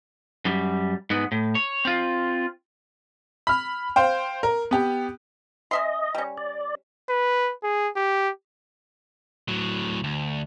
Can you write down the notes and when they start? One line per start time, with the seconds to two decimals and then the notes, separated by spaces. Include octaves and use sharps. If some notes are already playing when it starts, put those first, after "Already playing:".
0.45 F#2 G3
1.10 G#2 B3
1.32 A2
1.55 C#5
1.85 C4 F4
3.47 B5 F6
3.96 C5 F5 G5
4.43 A#4
4.71 B3 G4
5.71 C#4 D#5 E5 C6
6.15 G3 C#4
6.37 D5
7.09 B4
7.63 G#4
7.96 G4
9.48 A2 F#3
10.04 D2